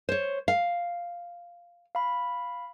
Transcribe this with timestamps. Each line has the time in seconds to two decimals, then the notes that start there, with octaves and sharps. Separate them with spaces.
0.09 C5 C#5
0.48 F5
1.95 F5 B5